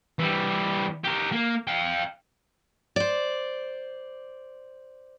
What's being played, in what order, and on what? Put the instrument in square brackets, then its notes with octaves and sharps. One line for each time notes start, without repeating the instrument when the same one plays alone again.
[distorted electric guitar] E3 G3
G4 A#4
A#3
F5 G5
[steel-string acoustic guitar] C5 D5